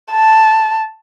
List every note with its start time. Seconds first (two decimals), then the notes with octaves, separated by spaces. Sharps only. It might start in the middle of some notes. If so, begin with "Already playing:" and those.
0.12 A5